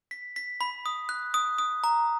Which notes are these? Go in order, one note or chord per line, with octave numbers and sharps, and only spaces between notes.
B6
B6
B5
D#6
F#6
D#6
D#6
A#5